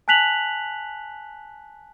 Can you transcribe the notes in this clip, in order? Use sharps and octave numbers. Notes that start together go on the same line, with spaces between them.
G#5 A5 F#6 B6 F7 F#7